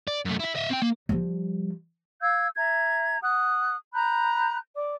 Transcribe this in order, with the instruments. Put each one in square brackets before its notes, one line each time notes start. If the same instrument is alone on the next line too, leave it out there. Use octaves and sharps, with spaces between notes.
[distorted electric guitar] D5
F#2 A3
E4 E5
D#5 E5
C4 G5
A#3
[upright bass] F3 G3
[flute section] F5 E6 G6 G#6
E5 A#5 G#6
F#5 D#6 F#6
A#5 B5 F#6 G6
D5 D6